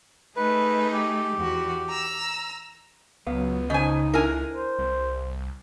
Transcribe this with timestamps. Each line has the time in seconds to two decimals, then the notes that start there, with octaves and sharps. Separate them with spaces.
0.36 A3 D#4 G#4 B4
0.92 G4
1.36 E2 F#4
1.88 A#5 E6
3.27 C#2 F#3 B3 F5
3.70 C#3 D#4 C5 D#5 G#5
4.14 D4 E4 A#4 G#5
4.50 C5
4.79 C2